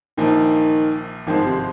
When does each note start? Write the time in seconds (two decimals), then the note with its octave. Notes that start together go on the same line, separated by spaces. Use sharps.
0.18 A#1 A#2 D#3 F3
1.27 G#1 G2 D#3 F3 G#3 C4
1.45 C3